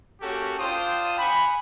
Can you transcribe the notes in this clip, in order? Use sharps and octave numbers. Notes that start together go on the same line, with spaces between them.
A#3 C#4 F#4 G4 A4
D4 F4 C5 G5 D#6
F#5 G#5 B5